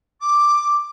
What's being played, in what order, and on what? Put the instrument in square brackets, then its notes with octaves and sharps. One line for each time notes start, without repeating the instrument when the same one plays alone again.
[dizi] D6